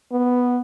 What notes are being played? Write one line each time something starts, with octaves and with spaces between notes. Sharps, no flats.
B3